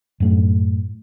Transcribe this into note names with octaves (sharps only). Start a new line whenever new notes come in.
F#2 A2 A3